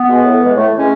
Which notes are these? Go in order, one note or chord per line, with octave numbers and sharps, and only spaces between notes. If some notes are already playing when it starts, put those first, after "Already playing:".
Already playing: B3
B2 G#3
A2
E3 G#3
A2 A3
E3 G#3 A3 C#4